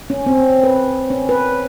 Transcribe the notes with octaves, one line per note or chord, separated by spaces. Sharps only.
C#4
C4
B4
C#4
B4